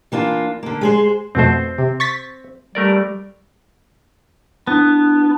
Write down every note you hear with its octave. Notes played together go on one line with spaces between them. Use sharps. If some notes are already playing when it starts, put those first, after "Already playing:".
E3 A#3 D4 F4
D3 A#3
G#3 G#4 C5
F2 B2 A3 C4 C5
C3
C#6 A6 B6
G3 A3 A#4 D5
B3 D4 E4